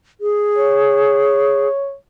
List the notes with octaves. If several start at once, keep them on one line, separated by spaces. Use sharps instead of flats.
G#4
C#5